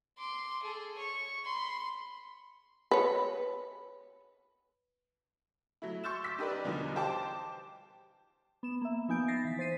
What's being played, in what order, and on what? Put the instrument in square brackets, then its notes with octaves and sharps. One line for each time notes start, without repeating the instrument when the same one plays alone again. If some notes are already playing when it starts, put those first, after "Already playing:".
[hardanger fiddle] C6 D6
G#4 A4
C#5 C#6
B5 C6
[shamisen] B4 C#5
[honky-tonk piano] F#3 A3 E4
C6 C#6 E6 G6 A6 E7
D6 E6 B6
D#4 G4 A#4 B4 D5
E2 B2 D3 F3 G3 D#4
G4 C5 G5 A5 D6
[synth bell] B3 E7
A#3 E5
F3 B3 D#4 G#5 G6 D7
A6 A#6 C7
E3 B6
C5 A6 B6 C7 D#7